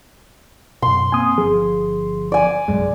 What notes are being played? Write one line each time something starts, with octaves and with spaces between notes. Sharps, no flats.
F#2 B2 C6
A#3 C4 G#5 D#6
G1 F3 G#4
D5 G#5
F1 A#1 F#2 G#3